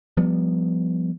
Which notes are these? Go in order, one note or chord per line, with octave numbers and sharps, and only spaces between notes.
F3 G3 B3